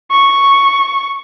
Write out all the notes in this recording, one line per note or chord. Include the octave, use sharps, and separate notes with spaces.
C#6